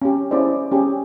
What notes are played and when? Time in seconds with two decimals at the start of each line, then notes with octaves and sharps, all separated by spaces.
0.02 C#4 G4
0.31 C#4 E4 G#4 C5 D5
0.71 C#4 G4 G#4